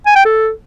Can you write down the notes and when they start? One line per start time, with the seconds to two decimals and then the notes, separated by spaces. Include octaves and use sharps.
0.06 G#5
0.15 G5
0.25 A4